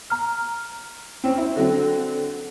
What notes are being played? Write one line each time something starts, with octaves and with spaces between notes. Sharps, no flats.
A#5 F6
C4 C#4
E4
D3 F#3 C4